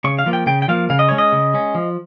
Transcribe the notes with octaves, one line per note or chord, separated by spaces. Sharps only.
C#3 C#6
F5
F3 A#3
G5
C#3 G5
G5
F3 A#3 F5
C#3 F5
D#5
G#3 C#4 C#5
D#5
C#3
G#3 C#4
F3